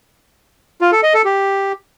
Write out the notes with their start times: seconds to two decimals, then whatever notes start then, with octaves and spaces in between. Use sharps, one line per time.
0.81 F4
0.92 A4
1.03 D#5
1.14 A4
1.25 G4